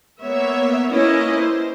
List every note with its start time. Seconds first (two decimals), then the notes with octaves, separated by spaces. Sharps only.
0.22 A#3 B3 C#5 E5
0.91 A#3 C#4 E4 B4 C#5 D#5
1.38 C5